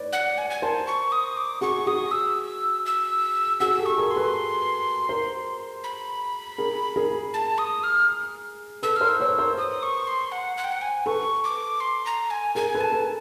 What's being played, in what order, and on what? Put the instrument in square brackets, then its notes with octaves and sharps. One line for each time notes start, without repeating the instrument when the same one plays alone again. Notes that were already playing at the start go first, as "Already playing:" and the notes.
Already playing: [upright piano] B4 C#5 D5
[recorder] F#5
G#5
G#5
[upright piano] A#4 C5 [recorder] A5
[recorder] C#6
D#6
D6
[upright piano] F#4 G#4 [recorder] C#6
[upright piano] F#4 G#4 [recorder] D#6
[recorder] E6
E6
[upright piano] F#4 G#4 [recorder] E6
[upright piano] G4 A4
[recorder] C#6
[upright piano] G#4 A#4
[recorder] C6
[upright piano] A4 B4
A#4 C5
[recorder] B5
[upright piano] G#4 A#4
G#4 A#4
[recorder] A5
D#6
F6
[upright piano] A4 B4 [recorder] E6
[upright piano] A#4 C5 [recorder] F6
[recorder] E6
[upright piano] B4 C#5
A#4 C5
[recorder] D#6
C#6
C6
F#5
F#5
G5
F#5
G#5
[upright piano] A4 B4 [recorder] C#6
[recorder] D6
C6
A#5
G#5
[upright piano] G#4 A#4 [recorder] G#5
[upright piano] A4 B4
[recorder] A5
[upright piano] A4 B4